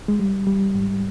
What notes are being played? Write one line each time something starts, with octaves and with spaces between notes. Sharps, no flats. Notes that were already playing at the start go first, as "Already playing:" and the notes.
G#3
G3
G3
G#2